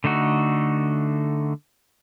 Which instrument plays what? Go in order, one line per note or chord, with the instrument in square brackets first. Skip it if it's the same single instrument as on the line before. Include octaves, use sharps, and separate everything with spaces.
[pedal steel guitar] D3 A3 D#4 F#4